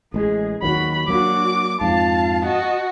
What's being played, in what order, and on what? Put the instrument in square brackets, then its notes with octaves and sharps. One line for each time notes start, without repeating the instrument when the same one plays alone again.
[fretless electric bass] A1 G#3 [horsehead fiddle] G#4
[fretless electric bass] D#2 D#3 F#3 [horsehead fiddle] F#4 B5
[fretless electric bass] F#3 A#3 [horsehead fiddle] D4 F#4 [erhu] D6
[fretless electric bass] F2 G#2 [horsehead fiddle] F4 F5 [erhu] A5
[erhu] F#4 [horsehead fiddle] D#5 A5